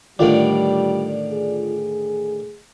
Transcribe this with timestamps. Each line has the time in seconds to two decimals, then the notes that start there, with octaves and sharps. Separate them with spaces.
0.19 A2 D3 D#3 G3 F4 D5
1.30 G#4